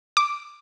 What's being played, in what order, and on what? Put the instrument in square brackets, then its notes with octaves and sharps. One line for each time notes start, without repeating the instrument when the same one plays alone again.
[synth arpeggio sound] D6